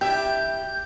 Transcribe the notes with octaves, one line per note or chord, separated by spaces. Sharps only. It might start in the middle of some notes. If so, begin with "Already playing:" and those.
D4 E4 G4 E5 G5 G6